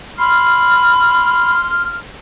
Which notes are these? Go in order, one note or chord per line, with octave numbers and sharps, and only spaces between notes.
B5 C6 F6